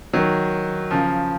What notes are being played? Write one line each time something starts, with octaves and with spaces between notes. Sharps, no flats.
D#3 F#3
C#3 F3